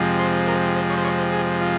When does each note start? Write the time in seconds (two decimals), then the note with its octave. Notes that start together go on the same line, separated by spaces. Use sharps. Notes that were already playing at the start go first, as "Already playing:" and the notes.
Already playing: F2 C3 F3 G#3
0.19 C5
0.47 A#4
0.76 C5
0.90 C#5
0.97 C5
1.05 C#5
1.18 C5
1.33 G#4
1.61 F4